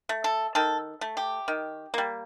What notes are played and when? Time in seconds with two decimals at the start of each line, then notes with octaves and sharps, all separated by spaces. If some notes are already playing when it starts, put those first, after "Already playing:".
0.09 A3
0.24 A4
0.55 D#3 A4
1.01 A3
1.17 G4
1.48 D#3
1.94 G3 A#3